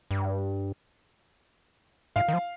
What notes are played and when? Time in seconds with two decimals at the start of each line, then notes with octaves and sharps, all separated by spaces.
0.11 G2
2.16 G#2 F5
2.28 D#3
2.33 F3